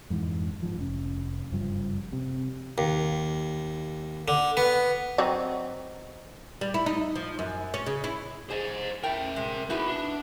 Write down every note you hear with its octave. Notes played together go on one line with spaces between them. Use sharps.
F2 G#2 E3
G#2 F3
F1 C#4
F#1 G2 F3
C3
D#2
D3
B3
F#3 C4 D#4
G3
E4
D#4
F3
F#2
C#4
C#3
E4
G#4 C5 D#5
A2 A#4 E5 G5
C3 G#3
B3 D#4 E4 F#4 G#4
D4